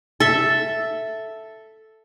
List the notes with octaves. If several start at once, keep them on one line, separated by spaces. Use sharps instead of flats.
A4 E5